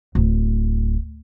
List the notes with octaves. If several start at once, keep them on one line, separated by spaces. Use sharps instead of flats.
D1